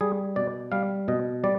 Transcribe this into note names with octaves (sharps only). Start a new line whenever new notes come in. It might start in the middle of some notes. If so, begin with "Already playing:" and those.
G3 G#4
B2 D5
G3 F5
B2 D#5
G3 D5